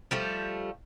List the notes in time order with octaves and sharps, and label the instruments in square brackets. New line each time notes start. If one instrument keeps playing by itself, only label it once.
[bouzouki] F3 G3 A3